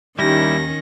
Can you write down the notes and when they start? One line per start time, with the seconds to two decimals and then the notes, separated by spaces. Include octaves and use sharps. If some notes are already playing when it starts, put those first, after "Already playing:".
0.19 D#2 D#3 G3 C#4 E4 A#6